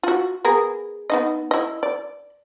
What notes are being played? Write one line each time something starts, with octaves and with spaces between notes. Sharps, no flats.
F4 F#4
B3 G#4 A#4
B3 D#4 D#5
E4 D#5
D5